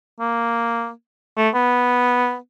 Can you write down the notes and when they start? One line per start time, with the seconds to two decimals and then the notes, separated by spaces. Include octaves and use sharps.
0.20 A#3
1.37 A3
1.54 B3